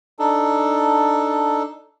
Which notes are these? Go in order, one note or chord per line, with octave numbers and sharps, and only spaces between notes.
D4 D#4 A4